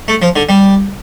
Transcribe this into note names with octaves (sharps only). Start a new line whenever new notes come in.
A3
F3
D3
G3